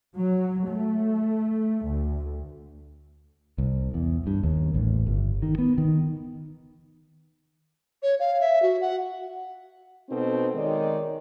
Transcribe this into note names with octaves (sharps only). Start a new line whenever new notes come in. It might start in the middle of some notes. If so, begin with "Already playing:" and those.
F#3
A3
D2
C2
E2
G2
D#2
A1
G1
D#3
B3
D#3
C#5
F5
E5
F#4
F#5
B2 C4 D#4 F#4 A4
D#3 G#3 D#4 C#5 D5